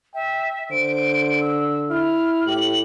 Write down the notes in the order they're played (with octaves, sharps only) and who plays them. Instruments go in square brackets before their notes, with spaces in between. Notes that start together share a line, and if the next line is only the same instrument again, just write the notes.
[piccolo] E5 [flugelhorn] G5
[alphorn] D3 [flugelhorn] C5 [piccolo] D7
[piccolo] E6
[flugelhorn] E4 [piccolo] F6
[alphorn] A2 [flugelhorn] G4 [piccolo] F#7